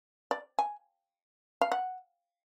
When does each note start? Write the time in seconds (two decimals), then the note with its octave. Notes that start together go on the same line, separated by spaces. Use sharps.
0.31 D5
0.59 G#5
1.61 F5
1.72 F#5